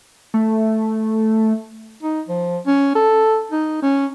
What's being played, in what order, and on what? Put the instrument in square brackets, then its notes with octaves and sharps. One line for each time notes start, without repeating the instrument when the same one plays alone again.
[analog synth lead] A3
[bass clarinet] D#4
F3
C#4
A4
D#4
C#4